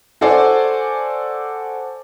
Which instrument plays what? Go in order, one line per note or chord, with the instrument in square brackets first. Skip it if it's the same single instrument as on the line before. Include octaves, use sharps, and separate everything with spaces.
[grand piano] F#4 A4 C5 D5 G#5